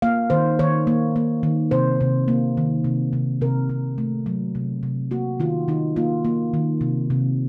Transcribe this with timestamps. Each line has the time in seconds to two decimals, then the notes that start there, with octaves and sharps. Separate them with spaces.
0.02 A#3 F5
0.30 D#3 C5
0.59 D#3 C#5
0.87 A#3
1.16 A#3
1.43 D#3
1.71 C3 C5
2.01 C3
2.28 A#3
2.57 D#3
2.84 C3
3.13 C3
3.41 C3 A#4
3.69 C3
3.98 A3
4.26 F#3
4.55 C3
4.83 C3
5.11 A#3 F#4
5.40 D#3 F4
5.68 D#3 D#4
5.96 A#3 F4
6.25 A#3
6.54 D#3
6.81 C3
7.10 C3